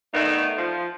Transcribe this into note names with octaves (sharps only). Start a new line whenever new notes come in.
D#3 A3 B3 D4 D#4
F3